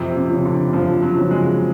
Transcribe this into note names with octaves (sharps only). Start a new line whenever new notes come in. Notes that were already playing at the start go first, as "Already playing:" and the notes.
Already playing: F2 C3
C3
C#3 F3
D3
F2 F3
F#3
C#3 F3
G#3